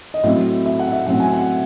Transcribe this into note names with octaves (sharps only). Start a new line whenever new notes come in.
D#5
A2 F#3 C4 E5
E5
F#5
E5
A2 F#3 C4 F#5
G#5
F#5